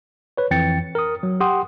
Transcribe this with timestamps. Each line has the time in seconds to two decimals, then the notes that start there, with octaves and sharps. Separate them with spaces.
0.37 B4 C#5
0.51 F2 E3 G5 A6 C#7
0.95 A#4 D#6
1.23 F#3
1.40 G4 F#5 G5 C6 D#6